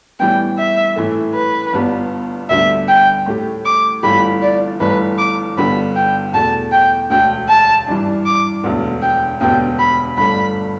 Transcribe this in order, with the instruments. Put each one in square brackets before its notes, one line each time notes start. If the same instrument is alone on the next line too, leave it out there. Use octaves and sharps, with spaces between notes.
[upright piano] A2 E3 G3 B3 [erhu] G5
[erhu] E5
[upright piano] A2 E3 A3
[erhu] B4
[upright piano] G1 G2 G3 B3
[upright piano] D2 D3 G3 B3 D4 [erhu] E5
[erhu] G5
[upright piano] A2 A3 G4
[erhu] D6
[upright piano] G1 G2 E3 A3 G4 [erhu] B5
[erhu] D5
[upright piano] G1 G2 E3 A3 [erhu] B4
[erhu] D6
[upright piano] G1 G2 D3 B3 G4 [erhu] B5
[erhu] G5
[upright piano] E2 B2 A3 [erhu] A5
[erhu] G5
[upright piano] E1 D2 D3 [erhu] G5
[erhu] A5
[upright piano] G2 E3 G3 D4
[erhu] D6
[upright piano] E1 D2 D3 B3
[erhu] G5
[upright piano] E1 D2 D3 B3 G4 [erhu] G5
[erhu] B5
[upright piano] G1 G2 D3 A3 D4 [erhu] B5